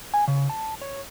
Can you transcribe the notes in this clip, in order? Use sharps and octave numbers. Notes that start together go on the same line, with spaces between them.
G#5
C#3
A5
C#5